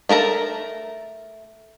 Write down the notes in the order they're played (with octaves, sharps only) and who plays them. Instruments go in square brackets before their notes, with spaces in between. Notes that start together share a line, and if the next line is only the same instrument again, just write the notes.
[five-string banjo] A3 A#4 A5 A#5